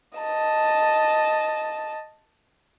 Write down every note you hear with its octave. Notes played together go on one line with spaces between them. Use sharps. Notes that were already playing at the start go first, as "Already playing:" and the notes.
D#5 A5